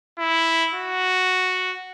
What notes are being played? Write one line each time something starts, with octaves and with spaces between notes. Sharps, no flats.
E4
F#4